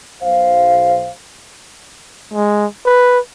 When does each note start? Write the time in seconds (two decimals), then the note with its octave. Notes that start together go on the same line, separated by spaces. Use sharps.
0.22 B1 C5 F5
2.34 G#3
2.86 B4